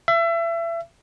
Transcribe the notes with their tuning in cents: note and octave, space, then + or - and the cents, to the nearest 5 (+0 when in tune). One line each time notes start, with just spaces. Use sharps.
E5 +30